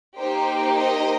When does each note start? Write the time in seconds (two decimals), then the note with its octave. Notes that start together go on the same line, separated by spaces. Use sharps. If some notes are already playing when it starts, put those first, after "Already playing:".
0.18 A#3 D#4 G4 C5
0.76 C5 D#5